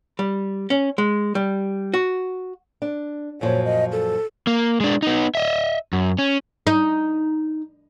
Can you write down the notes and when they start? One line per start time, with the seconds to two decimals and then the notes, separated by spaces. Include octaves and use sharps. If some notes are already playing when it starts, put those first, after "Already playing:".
0.19 G3
0.70 C#4
0.98 G#3
1.35 G3
1.94 F#4
2.82 D4
3.41 F#2 A#2 F3 C#5
3.65 D#5
3.92 A4
4.47 A#3
4.80 G#3 D4
5.02 B3 D#4
5.35 D#5 E5
5.93 F#2
6.19 C#4
6.67 D#4